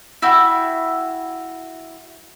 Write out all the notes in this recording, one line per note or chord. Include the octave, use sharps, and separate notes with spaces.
E4 F#4 G5 B5